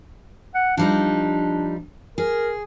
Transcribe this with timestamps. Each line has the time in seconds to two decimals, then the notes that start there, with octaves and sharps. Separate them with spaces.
0.54 F#5
0.77 F3 G3 D4 D#4
2.18 G#4 A#4